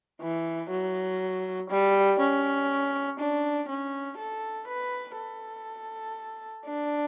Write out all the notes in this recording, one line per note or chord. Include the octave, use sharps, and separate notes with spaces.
E3
F#3
G3
C#4
D4
C#4
A4
B4
A4
D4